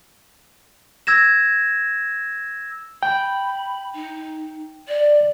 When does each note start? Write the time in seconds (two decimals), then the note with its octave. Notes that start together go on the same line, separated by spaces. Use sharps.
1.07 E6 G#6 A#6 E7
3.03 G5 B5
3.93 D#4
4.88 D5